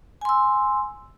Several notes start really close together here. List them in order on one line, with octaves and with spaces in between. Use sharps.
G#5 C6 E6